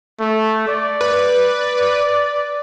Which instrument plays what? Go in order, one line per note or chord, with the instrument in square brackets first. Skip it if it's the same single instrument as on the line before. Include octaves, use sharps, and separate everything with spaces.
[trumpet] A3
D5
[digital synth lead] B4